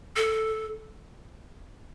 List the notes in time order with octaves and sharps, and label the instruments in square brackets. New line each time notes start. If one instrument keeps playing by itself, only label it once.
[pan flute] A4